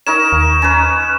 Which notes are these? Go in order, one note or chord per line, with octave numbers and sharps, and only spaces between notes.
D#4 A#4 C#5 E7
D#2
C#4 B4